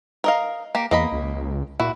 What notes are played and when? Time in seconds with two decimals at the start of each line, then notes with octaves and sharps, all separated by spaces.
0.24 A#4 D#5 F5
0.75 A#3 G4
0.91 E2 A#3 D#5 B5
1.12 C#2
1.80 A#2 E4 F#4